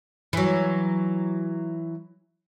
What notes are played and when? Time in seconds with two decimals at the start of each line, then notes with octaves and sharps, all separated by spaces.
0.33 E3 F#3